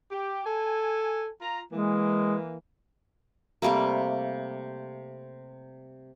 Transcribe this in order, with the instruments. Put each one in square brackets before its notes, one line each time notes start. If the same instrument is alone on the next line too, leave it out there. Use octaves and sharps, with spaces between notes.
[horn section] G4
A4 G#5
F4 A#5
[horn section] E3 A#3 [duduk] G#3
[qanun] C3 G3 A3 A#3